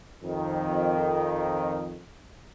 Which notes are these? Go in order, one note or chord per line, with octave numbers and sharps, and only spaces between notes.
F2 D#3